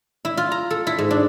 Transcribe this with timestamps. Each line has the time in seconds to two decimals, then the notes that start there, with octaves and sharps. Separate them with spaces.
0.25 E4
0.37 F4
0.52 A#5
0.70 A4
0.87 E4
0.98 G#2
1.11 D4